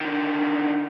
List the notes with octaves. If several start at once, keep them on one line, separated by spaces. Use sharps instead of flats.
D3 D#3